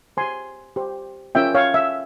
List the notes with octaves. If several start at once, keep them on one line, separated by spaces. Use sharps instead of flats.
G4 C5 G#5 C6
G4 C5
C#4 F4 A#4 C#5 E5 G5
C#5 F5
E5